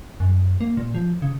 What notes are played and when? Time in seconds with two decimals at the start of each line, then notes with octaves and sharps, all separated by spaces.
0.20 F#2
0.61 A#3
0.77 A#2
0.94 F3
1.22 C#3